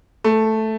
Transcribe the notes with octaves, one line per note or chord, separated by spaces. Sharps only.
A3